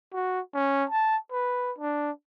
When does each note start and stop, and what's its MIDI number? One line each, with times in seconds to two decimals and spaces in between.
0.14 0.40 66
0.54 0.85 61
0.90 1.17 81
1.31 1.73 71
1.79 2.11 62